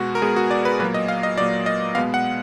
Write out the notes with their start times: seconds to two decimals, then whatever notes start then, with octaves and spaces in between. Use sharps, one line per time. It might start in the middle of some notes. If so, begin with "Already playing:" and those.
Already playing: B2 G#3 B3 F#4
0.15 A#4
0.22 B2 G#3 B3 G#4
0.36 F#4
0.51 D5
0.65 B4
0.79 A#2 F#3 A#3 B4
0.94 D#5
1.08 F5
1.23 D#5
1.37 A#2 F#3 A#3 D5
1.66 D#5
1.95 B2 G#3 B3 F5
2.14 F#5